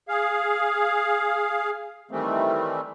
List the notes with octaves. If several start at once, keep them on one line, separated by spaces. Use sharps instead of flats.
G#4 F5
D#3 E3 G3 A3 C4